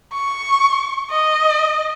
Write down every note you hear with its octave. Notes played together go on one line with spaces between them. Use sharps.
C#6
D#5